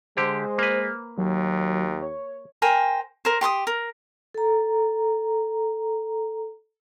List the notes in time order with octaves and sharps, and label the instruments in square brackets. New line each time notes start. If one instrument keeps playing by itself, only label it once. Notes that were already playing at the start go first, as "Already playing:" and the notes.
[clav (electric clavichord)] D3 G4 [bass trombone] G#3 [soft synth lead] C5
[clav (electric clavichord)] A#3 B4
[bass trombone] D#2 [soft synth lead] F#3
[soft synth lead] C#5
[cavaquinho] A#4 C5 G5 G#5
A#4 C5
G4 C6 D6 D#6
A#4
[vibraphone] A4 A#5